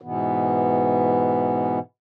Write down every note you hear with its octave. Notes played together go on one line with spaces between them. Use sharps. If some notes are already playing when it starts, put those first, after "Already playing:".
G#2 B2 E3 B3